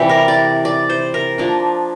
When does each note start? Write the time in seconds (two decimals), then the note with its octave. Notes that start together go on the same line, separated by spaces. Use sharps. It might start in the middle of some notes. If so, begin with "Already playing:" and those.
Already playing: C3 E3 G3 G4
0.09 A#4
0.28 D5
0.65 D5
0.90 C5
1.14 A#4
1.38 F3 A#3 D4